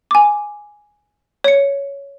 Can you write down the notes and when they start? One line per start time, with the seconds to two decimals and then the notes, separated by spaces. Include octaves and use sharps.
0.11 G#5 D6
1.44 C#5 C#7